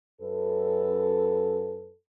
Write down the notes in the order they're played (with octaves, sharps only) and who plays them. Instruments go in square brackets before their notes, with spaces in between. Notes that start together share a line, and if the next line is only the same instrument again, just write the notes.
[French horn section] F#2 A4 B4